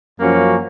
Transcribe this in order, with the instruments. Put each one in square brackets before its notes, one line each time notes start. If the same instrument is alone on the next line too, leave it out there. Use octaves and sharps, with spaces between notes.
[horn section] F#2 F3 A#3 C#4 F#4